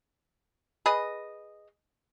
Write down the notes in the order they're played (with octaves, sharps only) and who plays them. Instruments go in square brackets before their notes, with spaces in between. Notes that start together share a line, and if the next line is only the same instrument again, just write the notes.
[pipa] G#4 B4 D#5